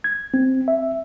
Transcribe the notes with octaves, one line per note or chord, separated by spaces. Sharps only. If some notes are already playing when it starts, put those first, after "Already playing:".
G#6
C4
E5